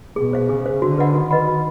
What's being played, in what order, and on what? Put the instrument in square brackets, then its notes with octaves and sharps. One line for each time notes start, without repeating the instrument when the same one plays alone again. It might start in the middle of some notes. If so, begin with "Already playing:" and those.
[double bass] B2 [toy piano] G#4
[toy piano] C5 F5
[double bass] C#3 [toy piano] G#4
[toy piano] C5 F5
[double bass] D3 [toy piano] F#4
[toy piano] B4 D#5 F#5 B5
[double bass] D#3 [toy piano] F#4
[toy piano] B4 D#5 F#5 B5
F#4